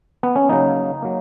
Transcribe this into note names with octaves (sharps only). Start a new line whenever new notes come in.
B3
C#4
C#3 F#3 A#3 D#4
F#3 A#3